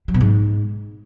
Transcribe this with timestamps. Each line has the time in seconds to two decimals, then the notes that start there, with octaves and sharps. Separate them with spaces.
0.08 F#3
0.14 B2
0.21 G#2